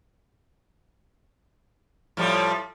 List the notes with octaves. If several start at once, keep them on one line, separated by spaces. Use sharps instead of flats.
A2 F3 G3